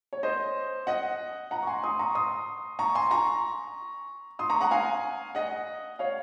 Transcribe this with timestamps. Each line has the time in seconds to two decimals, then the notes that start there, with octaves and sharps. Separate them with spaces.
0.13 C#5
0.23 C5 D#5
0.87 D#5 F#5
1.51 F#5 A#5
1.63 C#6
1.67 G#5 C6
1.84 C6 D#6
1.99 A#5 C#6
2.15 C6 D#6
2.79 A#5 C#6
2.95 G#5 C6
3.11 A#5 C#6
4.39 C6 D#6
4.50 A#5 C#6
4.61 F#5 A#5
4.71 F5 G#5
5.35 D#5 F#5
5.99 C#5 F5